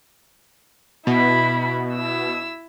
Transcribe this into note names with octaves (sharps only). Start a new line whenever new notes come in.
B2 E4 B5
E4 E6